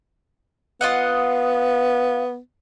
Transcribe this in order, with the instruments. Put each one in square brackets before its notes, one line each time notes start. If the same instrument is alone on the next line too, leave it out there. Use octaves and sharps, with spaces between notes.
[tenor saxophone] B3 [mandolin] F4 D#5 F#5